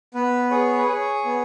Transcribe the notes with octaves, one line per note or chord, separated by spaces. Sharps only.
B3 B4
G#4 C#5
B4
G#4 C#5
B3